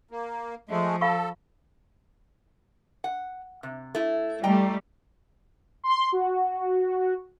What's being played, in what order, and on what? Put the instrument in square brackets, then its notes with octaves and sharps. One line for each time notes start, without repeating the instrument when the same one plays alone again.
[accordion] A#3
[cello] F3 [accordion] G#3 A3
[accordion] A4 [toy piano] F5 B5 C#6
[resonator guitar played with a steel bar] F#5
C3
A3 E4
[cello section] G3 A3 [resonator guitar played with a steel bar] D#5 G5 A#5
[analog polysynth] C6
F#4